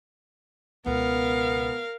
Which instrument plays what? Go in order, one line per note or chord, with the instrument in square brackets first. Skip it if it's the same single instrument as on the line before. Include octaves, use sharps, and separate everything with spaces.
[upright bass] C#2 B2 [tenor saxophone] B3 [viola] A#4 F5